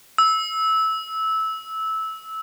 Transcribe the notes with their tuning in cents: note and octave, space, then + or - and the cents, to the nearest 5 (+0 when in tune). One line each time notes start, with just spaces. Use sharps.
E6 -15